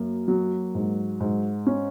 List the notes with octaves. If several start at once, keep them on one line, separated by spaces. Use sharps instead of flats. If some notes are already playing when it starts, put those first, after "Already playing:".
Already playing: F#2 A#3
F#3
G#2
G#2
C#4